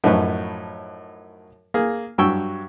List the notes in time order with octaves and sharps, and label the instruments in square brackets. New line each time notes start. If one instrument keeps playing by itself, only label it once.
[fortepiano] F#2 A2 F3 D#4 B4 C#6
A#3 G#4
G2 F#3 G5 C#6 E6